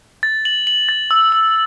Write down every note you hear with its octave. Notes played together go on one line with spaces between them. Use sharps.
A6
F#7
F#7
A6
E6
E6